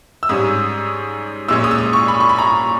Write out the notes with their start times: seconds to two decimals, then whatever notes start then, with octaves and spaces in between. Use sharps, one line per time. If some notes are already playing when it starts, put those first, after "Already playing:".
0.23 E6
0.29 G#2 G3 C#4 D#6
1.48 A#2 G#3 C#4 E6
1.64 D#6
1.71 E6
1.79 D#6
1.93 C#6
2.08 B5
2.20 C#6
2.29 B5
2.39 A#5